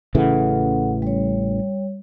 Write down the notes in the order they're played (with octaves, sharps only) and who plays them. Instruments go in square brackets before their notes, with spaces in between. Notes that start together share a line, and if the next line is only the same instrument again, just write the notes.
[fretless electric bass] A1 C#3 E3 [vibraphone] A4 F#5
[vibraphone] G3 C#5